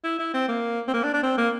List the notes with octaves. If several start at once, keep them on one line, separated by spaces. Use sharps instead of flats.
E4
E4
C4
A#3
C4
A#3
D4
D4
C4
A#3